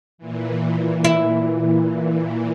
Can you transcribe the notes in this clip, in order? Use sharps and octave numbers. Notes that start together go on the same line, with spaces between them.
A#2 E3
E4